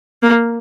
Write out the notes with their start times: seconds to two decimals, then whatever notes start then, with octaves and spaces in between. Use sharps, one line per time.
0.23 A#3